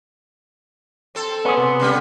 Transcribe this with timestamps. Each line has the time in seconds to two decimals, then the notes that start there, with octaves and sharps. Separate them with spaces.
1.15 C4 A4
1.45 B3 C#4 G#4
1.57 C3
1.80 C#3 G3